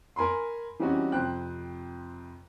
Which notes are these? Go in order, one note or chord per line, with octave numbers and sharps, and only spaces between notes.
A#4 G#5 B5 C6
E3 G3 C4 C#4 D#4 F#4
F2 C3 C5 G5 F#6